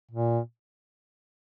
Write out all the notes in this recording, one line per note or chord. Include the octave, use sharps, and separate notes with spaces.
A#2